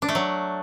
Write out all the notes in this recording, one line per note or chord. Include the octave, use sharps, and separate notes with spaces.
D4
A3
F#3